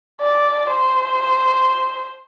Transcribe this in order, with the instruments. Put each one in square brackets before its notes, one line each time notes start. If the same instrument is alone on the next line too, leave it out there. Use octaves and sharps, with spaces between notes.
[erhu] D5
C5